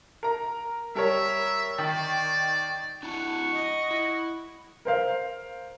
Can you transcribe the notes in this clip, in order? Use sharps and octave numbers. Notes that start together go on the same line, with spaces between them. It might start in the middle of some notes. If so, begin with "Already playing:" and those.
A#4 A#5
G3 A#4 C#5 E5
D#3 D5
D4 E4 F#5 A5 C#6
D#5
E4
A#4 C5 F5